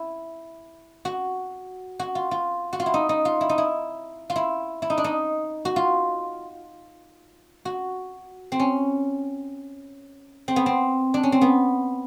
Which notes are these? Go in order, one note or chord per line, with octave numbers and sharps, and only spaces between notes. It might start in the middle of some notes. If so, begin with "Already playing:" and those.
Already playing: E4
F#4
F#4
F4
F4
F#4
F4
E4
D#4
D#4
F4
E4
D#4
E4
F4
E4
E4
D#4
D4
D#4
F#4
F4
F#4
C4
C#4
C4
B3
C4
D4
C#4
C4
B3